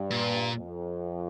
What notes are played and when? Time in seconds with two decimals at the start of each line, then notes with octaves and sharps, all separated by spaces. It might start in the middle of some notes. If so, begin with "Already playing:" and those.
Already playing: G2
0.11 A#2
0.57 F2